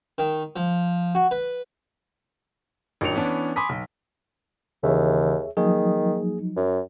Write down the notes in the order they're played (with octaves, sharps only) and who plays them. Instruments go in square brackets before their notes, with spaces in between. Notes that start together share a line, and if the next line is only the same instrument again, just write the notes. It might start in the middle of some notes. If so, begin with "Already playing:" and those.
[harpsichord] D#3
F3
F#4
B4
[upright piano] A1 D#3 F#3 D4 C#7 F7
E3 B3 C#4 D4
G#5 B5 C6 D6 D#6 B6
B1
[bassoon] D#2 [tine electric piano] C#3 E3 [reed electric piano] G#4 C#5 E5
[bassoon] D#3 [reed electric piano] F3 F#3 D#4 [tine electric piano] A#3 G#4
[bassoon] F#2